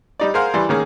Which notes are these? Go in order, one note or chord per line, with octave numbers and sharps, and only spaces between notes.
G3 D#4 D5
G#4 A#4 C5 F5 F#5
E3 G3 C6
D#3 G#3 A#3 C#4 G#4